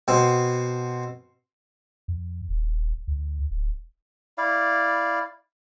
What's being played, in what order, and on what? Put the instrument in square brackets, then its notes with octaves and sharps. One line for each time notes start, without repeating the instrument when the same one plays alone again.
[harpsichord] B2 C4
[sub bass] F2
D#1
D2
D1
[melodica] E4 D5 F5